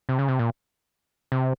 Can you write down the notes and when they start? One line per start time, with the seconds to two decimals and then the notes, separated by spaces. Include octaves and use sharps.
0.09 C3
0.19 C#3
0.28 C3
0.39 A#2
1.32 C3